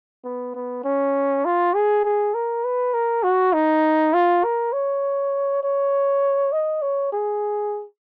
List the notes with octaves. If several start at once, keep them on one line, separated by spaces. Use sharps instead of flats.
B3
B3
C#4
F4
G#4
G#4
A#4
B4
A#4
F#4
D#4
F4
A#4
C#5
C#5
D#5
C#5
G#4